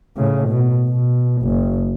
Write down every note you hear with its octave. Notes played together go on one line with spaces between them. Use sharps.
A2 C#3
B2
B2
F#1